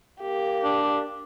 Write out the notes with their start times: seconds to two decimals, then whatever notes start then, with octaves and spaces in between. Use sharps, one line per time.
0.21 A#3 G4
0.64 D4